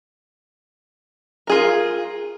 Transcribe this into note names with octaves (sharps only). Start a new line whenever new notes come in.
F4 G#4 A#4